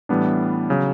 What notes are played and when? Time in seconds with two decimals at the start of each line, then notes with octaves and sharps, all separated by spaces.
0.09 A2 E3 G3 B3 D4
0.70 C#3 F#3